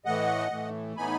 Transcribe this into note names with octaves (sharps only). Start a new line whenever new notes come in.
A2 E3 A3 D#5 F#5
A2 E3 A3
A2 E3 B3 D#4 G#5 B5